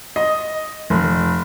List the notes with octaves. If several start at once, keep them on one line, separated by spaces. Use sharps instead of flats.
D#5
F1